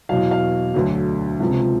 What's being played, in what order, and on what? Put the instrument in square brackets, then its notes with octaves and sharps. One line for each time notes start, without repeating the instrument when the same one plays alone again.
[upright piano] E2 B2 F#3 F5
F5
D2 D3 F#3
C#2 C3 F3